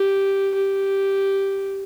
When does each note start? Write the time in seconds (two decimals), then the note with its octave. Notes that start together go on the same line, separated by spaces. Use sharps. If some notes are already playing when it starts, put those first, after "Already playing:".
Already playing: G4
0.54 G4